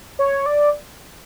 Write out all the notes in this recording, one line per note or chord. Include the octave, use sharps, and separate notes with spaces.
C#5
D5